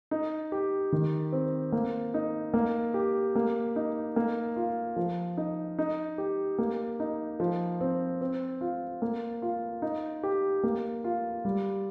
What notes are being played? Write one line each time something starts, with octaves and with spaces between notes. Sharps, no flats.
D#4
G4
D#3
C4
A#3
D#4
A#3
G4
A#3
D#4
A#3
F4
F3
D#4
D#4
G4
A#3
D#4
F3
C4
C4
F4
A#3
F4
D#4
G4
A#3
F4
G3